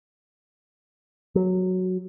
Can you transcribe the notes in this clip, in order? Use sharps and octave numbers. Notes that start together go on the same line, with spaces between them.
F#3